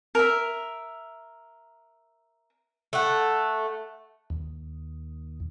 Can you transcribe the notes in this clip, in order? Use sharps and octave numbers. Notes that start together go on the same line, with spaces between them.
A#4 E5
A3 F#5
D#2